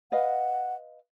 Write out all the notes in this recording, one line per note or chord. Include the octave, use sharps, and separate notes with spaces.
B4 D#5 F5 F#5